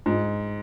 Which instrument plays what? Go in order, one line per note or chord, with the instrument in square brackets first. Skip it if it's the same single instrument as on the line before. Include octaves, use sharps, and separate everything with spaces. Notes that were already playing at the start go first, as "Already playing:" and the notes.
[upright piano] G#2